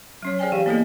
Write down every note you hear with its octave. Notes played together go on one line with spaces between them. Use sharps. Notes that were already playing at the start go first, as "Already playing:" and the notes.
F#3 C#4 C#5
G#4 C5 D5 G5 G#5
E3 G4 G#4 F5
A#3 B3 E4 G#4 A4 D#5